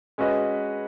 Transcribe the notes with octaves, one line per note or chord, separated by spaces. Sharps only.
G#3 C#4 F#4 B4 D#5